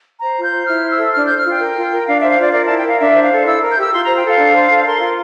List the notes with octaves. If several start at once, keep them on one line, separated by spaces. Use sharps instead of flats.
C5 A#5
F4
G6
C5
E4 F6
C5
E6
A4
D4 F6
C5 G6
F6
F4 G5
A#4
F4
A#4
D4 F5
C5 E5
F5
F4 D5
A#4 D5
E4 A5
G5
A#4 F5
D4 E5
C5
F5
A4
E4 E6
A#4
G6
G4 E6
F4 C6
C5 A#5
G5
A4 F5
D4
C5
A4
A#4 C6
F4